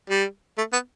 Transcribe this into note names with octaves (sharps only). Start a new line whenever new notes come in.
G3
A3
B3